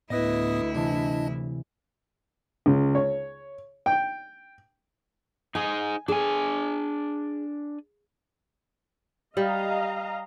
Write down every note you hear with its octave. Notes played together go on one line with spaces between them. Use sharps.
D2 A2 B3 E4 B4 D#5 D#6
C3 E3 D4 D#5 A5
C#2
C#5
G5
D#4 G#4 G#5
D4 G#4 G#5
G3 D#5 F5 A#5